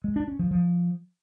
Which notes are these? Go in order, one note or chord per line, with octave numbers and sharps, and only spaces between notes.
G#3
D4
C#4
F3
F3